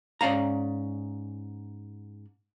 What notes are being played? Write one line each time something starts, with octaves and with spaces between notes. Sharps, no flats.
G#2 C#4 D5 F5 A#5